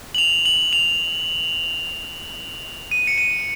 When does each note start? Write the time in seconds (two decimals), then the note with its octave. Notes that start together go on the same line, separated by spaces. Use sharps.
0.15 F#7
0.18 F7
0.46 F#7
0.73 F7
2.91 D#7
3.07 C#7
3.18 D#7